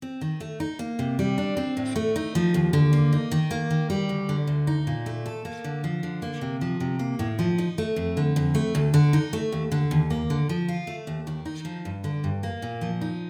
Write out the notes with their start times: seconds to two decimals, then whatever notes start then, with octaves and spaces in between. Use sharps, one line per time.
0.02 C4
0.21 D#3
0.40 A3
0.60 D#4
0.79 A#3
0.99 C3
1.19 G3
1.38 D4
1.57 C4
1.77 A2
1.96 A3
2.16 D#4
2.35 F3
2.54 D#2
2.73 D3
2.93 A#3
3.12 D#4
3.31 D#3
3.51 A#3
3.70 D#3
3.90 G3
4.09 D2
4.29 D3
4.47 D2
4.67 D#4
4.87 A#2
5.06 A3
5.26 A4
5.45 A#3
5.64 D3
5.84 F3
6.03 D3
6.22 A#3
6.41 C3
6.61 F3
6.80 C3
6.99 A#3
7.19 A2
7.39 F3
7.58 D#4
7.78 A3
7.96 F2
8.17 D3
8.36 F2
8.55 A3
8.75 D2
8.94 D3
9.13 D#4
9.33 A3
9.52 D#2
9.72 D3
9.91 D#2
10.10 A#3
10.30 D3
10.49 F3
10.68 F4
10.87 A3
11.07 D#2
11.27 D#3
11.45 D#4
11.65 F3
11.85 G2
12.04 D3
12.24 G2
12.43 A#3
12.62 A#2
12.81 F3
13.01 D#4